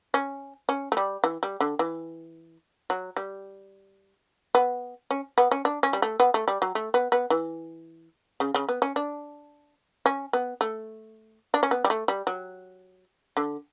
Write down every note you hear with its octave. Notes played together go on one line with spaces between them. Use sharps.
C#4
C#4
A3
G3
E3
G3
D3
E3
F#3
G3
B3
C#4
B3
C#4
D4
C#4
G3
A3
B3
A3
G3
F#3
A3
B3
B3
E3
C#3
C#3
B3
C#4
D4
C#4
B3
A3
D4
C#4
B3
G3
A3
G3
F#3
D3